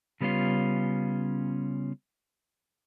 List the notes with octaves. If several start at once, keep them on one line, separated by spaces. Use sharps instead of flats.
C#3 G3 B3 C#4 F4